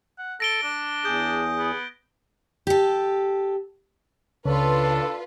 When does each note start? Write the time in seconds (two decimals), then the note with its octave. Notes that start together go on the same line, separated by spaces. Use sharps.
0.18 F#5
0.40 A4 A#6 D7 G7
0.63 D4
1.05 E2 G#4 D#6 G6
1.59 B3
2.67 G4 A4
4.45 C#2 C#3 D4 F4 A4 B4 C#5